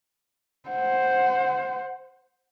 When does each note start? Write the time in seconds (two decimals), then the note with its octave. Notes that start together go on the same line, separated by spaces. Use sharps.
0.70 C5 F#5